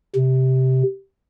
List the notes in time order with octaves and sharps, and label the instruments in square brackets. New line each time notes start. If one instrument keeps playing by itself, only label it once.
[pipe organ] C3